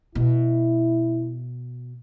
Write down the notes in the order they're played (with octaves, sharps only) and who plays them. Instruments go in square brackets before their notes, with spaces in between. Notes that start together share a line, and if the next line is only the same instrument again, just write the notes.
[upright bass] B2 [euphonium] E4